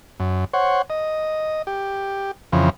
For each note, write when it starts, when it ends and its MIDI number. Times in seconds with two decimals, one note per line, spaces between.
0.20 0.45 42
0.54 0.82 72
0.54 0.82 73
0.54 0.82 78
0.90 1.62 75
1.67 2.31 67
2.52 2.70 41
2.52 2.70 49
2.52 2.70 52
2.52 2.70 53